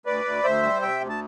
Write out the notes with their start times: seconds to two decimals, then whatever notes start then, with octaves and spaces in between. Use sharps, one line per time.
0.06 D2 B4 D5
0.25 D2
0.44 D2 C5 E5
0.63 G3
0.82 C3 E5 G5
1.01 D2
1.09 A5